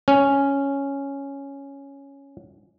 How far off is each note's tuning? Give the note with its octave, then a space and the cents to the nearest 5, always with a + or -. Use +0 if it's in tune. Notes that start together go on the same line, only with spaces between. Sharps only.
C#4 +0